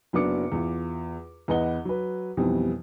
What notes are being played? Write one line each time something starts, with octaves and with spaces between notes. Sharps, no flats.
F#1 F#3 B3 D4 D6 C#7
E2 F4
E2 B4 D#5 F#5 G7
F#3 B4
B1 F2 B2 E3 G3